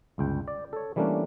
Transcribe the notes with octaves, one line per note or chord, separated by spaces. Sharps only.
G1 C#2 G5
D5
A4 C#5
E3 G3 A3 A#3 C#4 D4